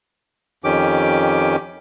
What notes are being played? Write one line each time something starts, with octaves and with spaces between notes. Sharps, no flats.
F2 D#3 C#4 G4 D6